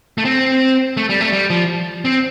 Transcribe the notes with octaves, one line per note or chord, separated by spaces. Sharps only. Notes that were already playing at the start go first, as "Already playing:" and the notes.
A3
C4
A3
G3
A3
G3
F3
C4